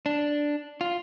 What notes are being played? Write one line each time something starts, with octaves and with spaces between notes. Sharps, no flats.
D4
F4